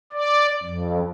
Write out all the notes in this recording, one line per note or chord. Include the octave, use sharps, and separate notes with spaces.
D5
F2